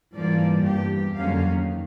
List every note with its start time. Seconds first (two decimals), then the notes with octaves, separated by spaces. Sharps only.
0.15 G#2 E3 F3 G3 A#3 D5
0.62 E2 G2 G4
1.16 F2 D3 F#3 A#3 C#4 F5
1.47 D#3